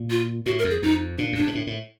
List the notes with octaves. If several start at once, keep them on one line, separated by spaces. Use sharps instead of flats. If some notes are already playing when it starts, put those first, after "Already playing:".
Already playing: A#2
F4
A2 F#4
A#4
F2
G#4
F2 D#4
A#2 D4
F#2
G2 D4
G#2
A2
A2